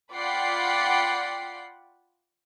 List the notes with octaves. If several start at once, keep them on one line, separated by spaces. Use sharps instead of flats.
F4 D5 F#5 G5 B5 C7